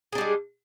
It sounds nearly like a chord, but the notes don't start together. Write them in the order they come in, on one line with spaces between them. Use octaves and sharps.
G#4 D4 G3 G#3